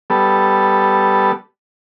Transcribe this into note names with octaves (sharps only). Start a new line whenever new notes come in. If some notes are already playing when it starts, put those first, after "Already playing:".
G3 B3 A4